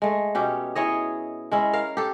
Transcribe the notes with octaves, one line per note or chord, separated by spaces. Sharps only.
G#3 A3
B2 C#4 G4
E4 G#4 C#5 D#5
G#3 C#4 E4
A#4 F5
G4 A4